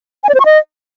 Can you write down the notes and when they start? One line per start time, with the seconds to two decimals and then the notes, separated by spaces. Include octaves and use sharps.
0.24 G#5
0.29 D5
0.35 C5
0.40 C#6
0.45 D#5